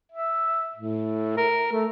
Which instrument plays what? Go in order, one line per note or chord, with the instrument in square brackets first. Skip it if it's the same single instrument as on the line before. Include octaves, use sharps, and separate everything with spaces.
[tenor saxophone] E5
A2
A#4
A3